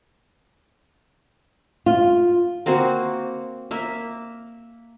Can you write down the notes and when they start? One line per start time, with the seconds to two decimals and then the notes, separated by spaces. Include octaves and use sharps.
1.86 F4
2.66 A#3 C4 F#4 C5
3.71 A#3 E5